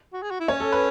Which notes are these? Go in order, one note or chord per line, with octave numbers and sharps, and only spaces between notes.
F#4
G#4
F#4
E4
C#4 C#5
A4
B4